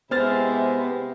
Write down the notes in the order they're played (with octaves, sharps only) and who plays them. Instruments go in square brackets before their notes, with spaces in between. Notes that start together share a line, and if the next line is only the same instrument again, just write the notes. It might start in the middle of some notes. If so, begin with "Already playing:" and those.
[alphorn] C3 [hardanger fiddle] G#3 E4 [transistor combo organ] B3 [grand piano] C5 F6 A6